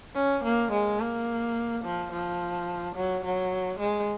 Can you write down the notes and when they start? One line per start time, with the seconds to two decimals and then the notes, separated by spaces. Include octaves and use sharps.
0.15 C#4
0.44 A#3
0.72 G#3
1.00 A#3
1.84 F3
2.12 F3
2.95 F#3
3.25 F#3
3.80 G#3